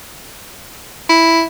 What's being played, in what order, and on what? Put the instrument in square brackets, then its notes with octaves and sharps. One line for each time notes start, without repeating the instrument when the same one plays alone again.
[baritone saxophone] E4